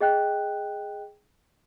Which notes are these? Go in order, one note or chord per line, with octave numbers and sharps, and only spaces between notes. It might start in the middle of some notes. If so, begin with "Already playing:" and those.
G#4 D#5 G5 F#6